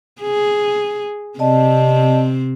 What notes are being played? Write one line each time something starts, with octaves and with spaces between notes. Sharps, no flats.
G#4
C3 C4 D5 D#5 A5